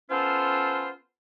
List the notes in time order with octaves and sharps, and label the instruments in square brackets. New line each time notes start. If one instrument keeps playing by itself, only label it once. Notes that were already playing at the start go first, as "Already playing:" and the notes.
[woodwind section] B3 C#4 F4 A4 C5